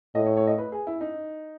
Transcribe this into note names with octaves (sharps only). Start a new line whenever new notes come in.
A2 D#5
C#5
C#5
D#5
B4
G#4
E4
D#4